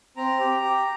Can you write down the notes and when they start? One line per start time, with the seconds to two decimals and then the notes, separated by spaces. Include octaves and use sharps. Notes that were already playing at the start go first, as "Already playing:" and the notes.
0.17 C4 A#5
0.39 G4
0.62 G4